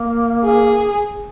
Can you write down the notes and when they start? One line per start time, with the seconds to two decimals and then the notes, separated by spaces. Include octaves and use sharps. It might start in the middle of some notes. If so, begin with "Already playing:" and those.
Already playing: A#3
0.44 G#4